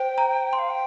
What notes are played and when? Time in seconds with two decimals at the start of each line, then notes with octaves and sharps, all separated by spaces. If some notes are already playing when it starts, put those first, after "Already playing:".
Already playing: C5 G5
0.18 A#5
0.53 C6
0.59 F5
0.70 G5